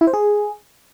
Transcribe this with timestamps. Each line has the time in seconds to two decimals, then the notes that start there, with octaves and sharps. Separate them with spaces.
0.01 E4
0.07 C5
0.13 G#4